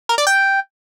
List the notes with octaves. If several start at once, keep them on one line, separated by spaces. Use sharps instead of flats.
A#4
D5
G5